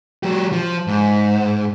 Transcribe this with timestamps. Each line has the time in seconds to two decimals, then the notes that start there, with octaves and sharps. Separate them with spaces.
0.23 F#3 G4
0.52 F3
0.87 G#2